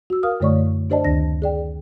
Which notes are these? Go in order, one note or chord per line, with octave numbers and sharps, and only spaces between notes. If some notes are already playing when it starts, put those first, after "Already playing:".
F#4 E6
A#4 F5 D#6 F6
F#2 D3 A3 C#5 D5 C#6
D4 G4 C5 D5 D#5 A5
D2 D#3 D4 A#6
G#4 D5 G5